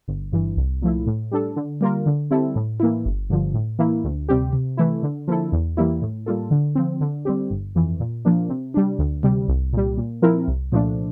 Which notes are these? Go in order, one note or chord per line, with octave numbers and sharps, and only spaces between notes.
G1
G2 E3
C2
A#2 F3 A3 E4
A2
G3 D4 A4
D3
G3 A#3 F4 A#4
D3
G3 C4 E4 A4
A2
E3 A#3 E4
G1
G2 D3 F3
A2
E3 A#3 E4
D2
C3 G3 C4 G4
C3
E3 A3 E4
D3
F3 A#3 E4 A4
E2
E3 G3 A#3 E4
A2
G3 A#3 F4 A4
D3
F3 C4
D3
G3 C4 G4
G1
F2 E3
A#2
F3 A#3 D4
C3
G3 D4
D2
C3 G3
C2
A#2 G3
A#2
F3 C4 E4 A#4
C2
A#2 F3 A3 D4